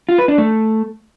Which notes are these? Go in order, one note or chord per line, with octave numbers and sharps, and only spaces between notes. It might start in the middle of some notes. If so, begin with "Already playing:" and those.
F4
B4
D4
A3